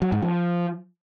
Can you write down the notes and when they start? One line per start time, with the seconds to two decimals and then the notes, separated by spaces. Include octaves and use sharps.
0.02 F#3
0.12 G#2
0.22 F3